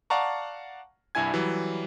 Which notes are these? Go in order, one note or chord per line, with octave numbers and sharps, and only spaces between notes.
D5 F5 F#5 A5 A#5 C#6
C2 G2 E4 G#5 G#6
E3 F#3 G3